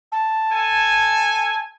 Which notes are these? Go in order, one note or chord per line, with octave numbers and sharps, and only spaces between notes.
A5
A4 G#5